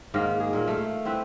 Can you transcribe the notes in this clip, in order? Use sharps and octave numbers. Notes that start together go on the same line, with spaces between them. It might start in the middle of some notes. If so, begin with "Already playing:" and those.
G#2 D#3 A#3
G#4
A#2 A#3
A3 F5
C4 E4 B4